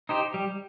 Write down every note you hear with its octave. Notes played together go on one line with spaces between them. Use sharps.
D#4 G4 C5
G3